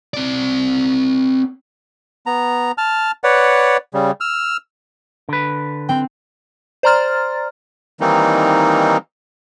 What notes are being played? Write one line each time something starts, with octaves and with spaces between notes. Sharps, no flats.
C4 D5
B3 A#5
A5 F6
B4 C#5 D5 F#5
C#3 G3
E6 F6
D3 B4
C4 G5
C5 D5 A#5 C6 F6 A6
D#3 E3 G3 A#3 C4 D#4